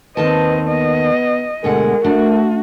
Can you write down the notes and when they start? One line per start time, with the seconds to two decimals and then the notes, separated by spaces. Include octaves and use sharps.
0.17 D#2 D#3 C4 B4 D#5 A5
0.68 B3 D#5
1.64 D2 B2 G#3 A#4 F#5
2.04 A3 D4 F#4